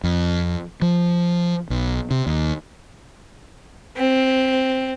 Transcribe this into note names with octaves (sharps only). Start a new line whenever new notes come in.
F2
F3
B1
C3
D#2
C4